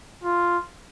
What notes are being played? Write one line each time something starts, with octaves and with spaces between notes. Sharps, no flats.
F4